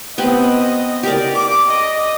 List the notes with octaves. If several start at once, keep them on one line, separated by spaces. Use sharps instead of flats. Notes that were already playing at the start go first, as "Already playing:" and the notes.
B3 C4 G4 D#5
G4 A#4 D5
D6
D#5